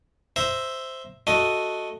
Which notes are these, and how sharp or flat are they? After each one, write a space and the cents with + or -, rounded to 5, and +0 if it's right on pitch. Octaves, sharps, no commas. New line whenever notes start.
C5 +0 E5 +0 A#5 +0
A3 +0 F#4 +0 D#5 +0